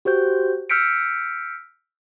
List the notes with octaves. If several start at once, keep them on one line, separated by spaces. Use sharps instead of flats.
F#4 G4 C5 G6
E6 F6 G6 B6 C#7 D7